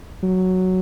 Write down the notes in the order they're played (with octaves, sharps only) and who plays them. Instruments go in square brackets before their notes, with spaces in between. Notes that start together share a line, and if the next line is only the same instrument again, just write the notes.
[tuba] F#3